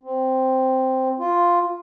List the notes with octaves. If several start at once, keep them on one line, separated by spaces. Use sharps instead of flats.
C4
F4